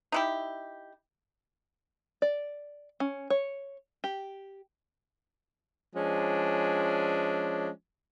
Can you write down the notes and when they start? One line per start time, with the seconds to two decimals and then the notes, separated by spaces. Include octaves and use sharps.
0.12 D#4 E4 G4
2.22 D5
3.00 C#4
3.30 C#5
4.04 G4
5.96 F3 G#3 C#4 D4